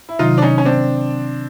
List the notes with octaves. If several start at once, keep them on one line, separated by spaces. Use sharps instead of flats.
E4
C3 D#3 F#3 D#4 F4
D4
C#4 D#4
C#4
C4 D4